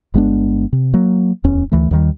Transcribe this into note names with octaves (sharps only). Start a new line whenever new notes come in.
G1 G#3 B3 D4
C3
F#3 A#3
D1 E2 C#4
D2 E3 A3
D#2 D#3 G3